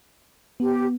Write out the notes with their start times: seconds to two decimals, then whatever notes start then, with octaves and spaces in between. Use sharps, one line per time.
0.60 B3 G4